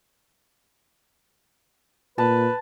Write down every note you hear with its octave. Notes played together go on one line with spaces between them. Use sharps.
A#2 B4 A5